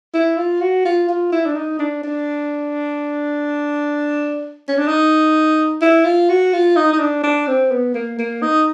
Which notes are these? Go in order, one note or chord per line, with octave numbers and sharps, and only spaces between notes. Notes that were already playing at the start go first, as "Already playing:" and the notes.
E4
F4
F#4
F4
F4
E4
D4
D#4
D4
D4
C#4
D4
D#4
E4
F4
F#4
F4
D#4
D#4
D4
D4
C4
B3
A#3
A#3
D#4